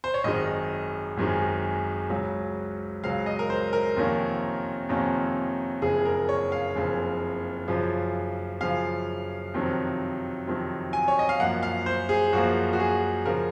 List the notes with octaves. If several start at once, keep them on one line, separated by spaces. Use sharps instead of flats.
C5
C#5
G#1 F#2 D#3 G#3 D#5
G#1 F#2 D#3 G#3
C#2 C#3 F#3
C#2 C#3 F#3 F5
D#5
A#4
C5
A#4
F2 C3 D#3 A#3 C#4
F2 C3 D#3 A#3 C#4
F#1 F2 C#3 G#4
A#4
C#5
F5
F#1 F2 C#3
F#2 C#3 F3
F#2 C#3 F3 F5
F2 C3 D#3 F#3
F2 C3 D#3 F#3
G#5
C#5
D#5
F5
F#2 F3 A#3 F#5
F5
C5
G#4
F#2 F3 A#3 F#4
F#4
G#4
C#3 F3 A#4